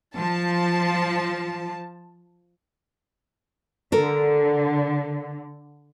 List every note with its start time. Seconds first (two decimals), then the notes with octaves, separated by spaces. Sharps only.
0.16 F3 A5
3.92 D3 A4 A#4